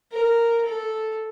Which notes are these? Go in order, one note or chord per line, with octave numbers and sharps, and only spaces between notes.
A#4
A4